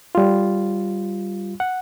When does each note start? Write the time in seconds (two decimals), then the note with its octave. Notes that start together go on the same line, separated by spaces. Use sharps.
0.15 G3 F4
1.60 F#5